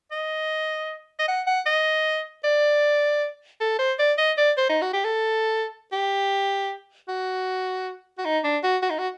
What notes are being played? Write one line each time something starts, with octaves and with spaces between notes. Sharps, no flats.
D#5
D#5
F#5
F#5
D#5
D5
A4
C5
D5
D#5
D5
C5
D#4
F#4
G4
A4
G4
F#4
F#4
D#4
D4
F#4
F#4
D#4
F#4